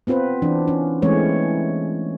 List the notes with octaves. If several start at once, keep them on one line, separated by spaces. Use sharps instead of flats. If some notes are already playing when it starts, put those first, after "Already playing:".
B3 C4 F4 B4 C5
E3 D4
C#4
E3 G#3 A3 C4 C#4 C#5